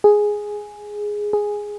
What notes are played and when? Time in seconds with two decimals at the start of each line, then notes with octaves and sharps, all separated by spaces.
0.04 G#4
1.33 G#4